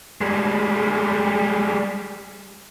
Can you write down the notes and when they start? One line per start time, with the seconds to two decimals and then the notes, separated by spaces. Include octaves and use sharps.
0.21 G3 G#3